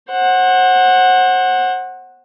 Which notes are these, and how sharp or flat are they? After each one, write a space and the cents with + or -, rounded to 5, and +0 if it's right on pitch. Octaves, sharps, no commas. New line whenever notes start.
C5 +35 F#5 +0